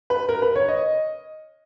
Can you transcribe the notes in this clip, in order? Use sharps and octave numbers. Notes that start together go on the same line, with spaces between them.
B4
A#4
B4
C#5
D#5